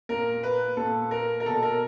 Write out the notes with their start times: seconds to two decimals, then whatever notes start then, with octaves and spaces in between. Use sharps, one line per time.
0.09 A#2 A#4
0.43 B4
0.77 A#2 A4
1.11 A#4
1.40 A#4
1.46 B2 A4
1.63 A#4